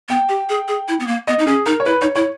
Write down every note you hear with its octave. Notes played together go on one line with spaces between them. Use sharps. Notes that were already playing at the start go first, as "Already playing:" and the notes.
B3 G5
G4
G#4
G#4
E4
B3
A#3
B3 D#5
D#4
C#4 G#4
D#4 A#4
C#5
E4 B4
D#4 C#5
E4 C#5